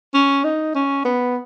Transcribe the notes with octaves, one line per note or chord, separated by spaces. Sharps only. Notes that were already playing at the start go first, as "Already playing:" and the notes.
C#4
D#4
C#4
B3